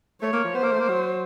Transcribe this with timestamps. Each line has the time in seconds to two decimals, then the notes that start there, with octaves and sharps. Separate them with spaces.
0.21 A3 C#5
0.33 A#3
0.44 F3
0.54 B3 C5
0.63 A#3
0.71 A3
0.79 A#3
0.89 F#3